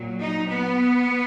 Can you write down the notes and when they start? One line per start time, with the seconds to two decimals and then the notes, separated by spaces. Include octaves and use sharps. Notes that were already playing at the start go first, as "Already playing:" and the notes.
Already playing: A#2 F#3
0.21 D#4
0.49 B3